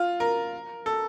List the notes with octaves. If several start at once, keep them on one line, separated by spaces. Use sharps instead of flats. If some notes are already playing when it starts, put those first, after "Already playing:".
Already playing: F4
A#4
A4